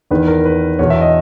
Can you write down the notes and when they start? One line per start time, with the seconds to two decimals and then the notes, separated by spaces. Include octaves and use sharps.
0.11 E2 D#3 B4
0.27 A#4
0.45 B4
0.79 E2 C#5
0.83 B2
0.90 E5
1.01 D#5